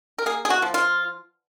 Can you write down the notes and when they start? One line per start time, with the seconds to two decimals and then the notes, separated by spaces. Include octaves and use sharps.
0.18 A#4
0.26 A#3 G#4
0.45 G#4
0.50 F#4
0.62 F3
0.74 F4